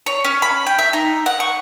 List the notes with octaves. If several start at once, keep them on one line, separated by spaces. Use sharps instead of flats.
C#5
C#4
B5
G5
E5
D#4
F#5
C#6